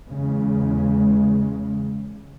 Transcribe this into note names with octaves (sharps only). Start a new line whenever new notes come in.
E2 C#3 G#3